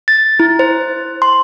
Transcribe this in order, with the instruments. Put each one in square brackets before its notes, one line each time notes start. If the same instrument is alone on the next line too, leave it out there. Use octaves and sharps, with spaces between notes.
[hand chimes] A6
E4
C5
C6